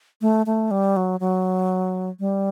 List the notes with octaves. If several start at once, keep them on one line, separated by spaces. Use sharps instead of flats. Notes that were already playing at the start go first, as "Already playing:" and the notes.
A3
A3
G3
F#3
F#3
G3